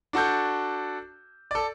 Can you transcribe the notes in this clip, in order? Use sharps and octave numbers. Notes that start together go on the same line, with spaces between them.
D4 F#4 A4 G6
A4 D5